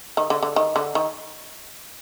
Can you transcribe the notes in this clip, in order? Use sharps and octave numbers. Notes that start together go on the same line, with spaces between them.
D#3
D3
D3
D#3
D3
D#3